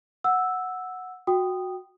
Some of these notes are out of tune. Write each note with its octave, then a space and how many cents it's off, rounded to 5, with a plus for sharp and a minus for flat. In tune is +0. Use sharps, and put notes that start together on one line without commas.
F#5 -5 E6 +0
F#4 -10 G5 +0 D#6 -10